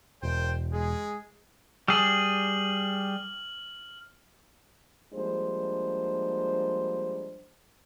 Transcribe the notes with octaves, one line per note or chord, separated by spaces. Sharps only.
E1 A#4 C5 G5
G#3 G#4
G3 G#4 F6 F#7
F3 G3 G#3 A#3 D4 C5